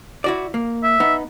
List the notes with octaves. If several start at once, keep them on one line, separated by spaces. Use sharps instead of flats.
E4 F#4 D5
A#3
E5
B3 D#4